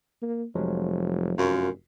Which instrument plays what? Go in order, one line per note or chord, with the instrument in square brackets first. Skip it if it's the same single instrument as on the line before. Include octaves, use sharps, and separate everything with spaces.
[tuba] A#3
[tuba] F1 [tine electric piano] F3 F#3 G#3
[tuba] F1 [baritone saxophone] F#2 [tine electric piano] F4 F#4 A#4